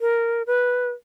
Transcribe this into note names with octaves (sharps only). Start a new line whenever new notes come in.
A#4
B4